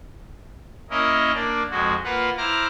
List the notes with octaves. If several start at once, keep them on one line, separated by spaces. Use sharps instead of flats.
A#3 C#4 E4 A#4 D#5
A#3 D4 D5
F2 G#3 F#4
A#3 F4 B4 F#5
E4 C5 A#5 D6 F6